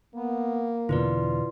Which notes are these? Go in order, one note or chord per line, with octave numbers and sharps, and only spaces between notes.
A#3 B3
E2 B2 D3 E4 F4 B4 D5